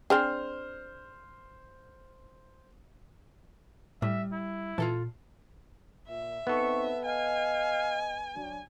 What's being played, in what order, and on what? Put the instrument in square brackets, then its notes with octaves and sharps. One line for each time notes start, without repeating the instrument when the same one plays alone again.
[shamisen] C4 D4 G#4 [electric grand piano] C5 F6
[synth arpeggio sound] A2 [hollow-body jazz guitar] G3 [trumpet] E5
[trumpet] E4
[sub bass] A#2 [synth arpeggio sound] E3 [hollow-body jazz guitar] F4 A4 A5
[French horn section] A#2 [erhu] E5
[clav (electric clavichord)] B3 A4 [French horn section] C4 D#4 [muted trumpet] C#6
[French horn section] D#5 [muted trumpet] F5 [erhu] G#5
[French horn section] F#3 D4